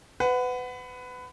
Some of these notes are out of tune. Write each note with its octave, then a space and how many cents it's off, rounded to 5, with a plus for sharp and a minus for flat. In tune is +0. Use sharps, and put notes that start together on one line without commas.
B4 +25 F#5 +0